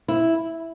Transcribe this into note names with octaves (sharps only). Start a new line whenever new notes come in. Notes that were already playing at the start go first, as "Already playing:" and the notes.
E4